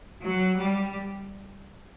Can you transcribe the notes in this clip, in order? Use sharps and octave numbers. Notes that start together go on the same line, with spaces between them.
F#3
G3